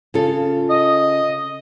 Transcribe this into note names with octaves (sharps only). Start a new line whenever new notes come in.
C#3 F4 A4
D#5